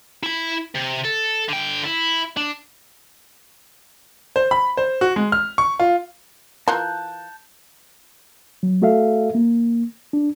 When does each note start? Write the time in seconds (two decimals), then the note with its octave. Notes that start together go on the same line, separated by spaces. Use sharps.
0.23 E4 B5
0.75 C3
1.05 A4
1.49 D3 G5
1.85 E4
2.37 D4
4.36 C5
4.51 B5
4.77 C5
5.01 F#4
5.16 G#3
5.32 F6
5.58 C#6
5.80 F4
6.68 E3 F4 A#4 A5 F#6 G6
8.63 F#3
8.82 A3 F#4 A4 E5 F5
9.35 A#3
10.13 D4